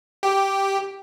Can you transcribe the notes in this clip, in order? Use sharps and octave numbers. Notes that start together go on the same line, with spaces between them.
G4